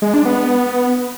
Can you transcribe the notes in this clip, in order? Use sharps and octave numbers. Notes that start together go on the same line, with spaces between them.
G#3
D4
B3